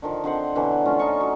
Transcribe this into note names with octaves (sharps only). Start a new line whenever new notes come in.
D3 D#3 F3
D3 C4 C5 F#5
B2 D3 E3 F#3
F3 A3 C#4 F4
D#4 F4 A5 C#6
F#3